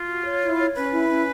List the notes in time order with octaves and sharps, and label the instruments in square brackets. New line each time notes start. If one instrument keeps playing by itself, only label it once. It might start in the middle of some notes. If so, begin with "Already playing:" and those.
Already playing: [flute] F4
[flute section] F#4
C#5
E4
C#5
[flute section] C#4 [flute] B4
[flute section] E4
C#4